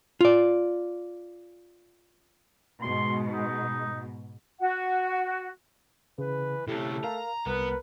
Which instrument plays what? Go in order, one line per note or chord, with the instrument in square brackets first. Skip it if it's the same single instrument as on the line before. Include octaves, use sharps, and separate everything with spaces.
[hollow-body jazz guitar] F4 D5
[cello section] G#2 B2 [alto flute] G#3 [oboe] C6
[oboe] D#4
[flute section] F#4 F#5
[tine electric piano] C#3 [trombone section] E3 B4
[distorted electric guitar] C3 C#4 [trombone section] A3 A4 [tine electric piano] E4 G4
[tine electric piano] A#4 F5 [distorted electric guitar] A#5
[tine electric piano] C2 [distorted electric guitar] B3 [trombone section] A#4 B4